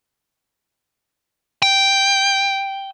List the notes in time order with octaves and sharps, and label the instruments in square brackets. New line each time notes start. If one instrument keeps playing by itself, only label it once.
[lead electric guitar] G5